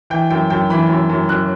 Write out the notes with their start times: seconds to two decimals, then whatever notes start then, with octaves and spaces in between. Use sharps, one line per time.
0.10 E3 G5
0.30 F#2 G5
0.50 F#2 G5
0.70 E3 B5
0.90 F#2
1.10 F#2
1.29 F#2 F#6